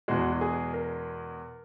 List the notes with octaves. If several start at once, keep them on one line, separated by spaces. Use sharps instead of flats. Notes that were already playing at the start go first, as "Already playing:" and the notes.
E2 B2 G#3 F#4
F#4
G#4
A#4